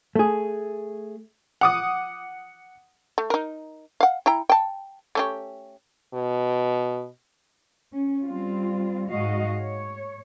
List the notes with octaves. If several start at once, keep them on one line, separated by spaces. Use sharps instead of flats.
A3 G#4
F#5 D6 D#6
A3
D#4 A#4
F5 F#5
E4 G5 A#5
G5 A5
A3 C#4 G4
B2
C#4
G3 C4 F4
G#2 G#3 F#4 D#5 F5
C#5